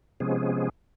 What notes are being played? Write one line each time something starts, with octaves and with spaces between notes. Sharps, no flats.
C3 F3 G#3 B3 C#4 G#4